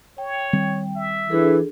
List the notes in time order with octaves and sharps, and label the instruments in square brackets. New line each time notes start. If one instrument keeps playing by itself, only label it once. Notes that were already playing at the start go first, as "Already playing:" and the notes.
[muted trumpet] C#5 [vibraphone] G5
[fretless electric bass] D#3 G3 C4
[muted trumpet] E5
[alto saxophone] E3 [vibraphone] D4 G#4 A4